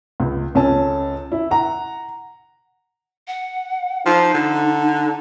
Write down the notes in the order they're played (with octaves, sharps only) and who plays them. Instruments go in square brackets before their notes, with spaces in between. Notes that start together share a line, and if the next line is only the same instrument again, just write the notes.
[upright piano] C#2
C#2 C#4 A4 A5
E4
F#5 A#5
[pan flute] F#5
[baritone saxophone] F3 [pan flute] D#4
[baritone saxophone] D3